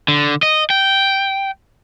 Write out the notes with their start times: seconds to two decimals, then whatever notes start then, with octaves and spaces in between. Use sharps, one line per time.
0.08 D3
0.43 D#5
0.70 G5